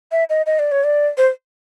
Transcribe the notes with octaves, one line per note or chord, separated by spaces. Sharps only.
E5
D#5
D#5
D5
C#5
D5
C5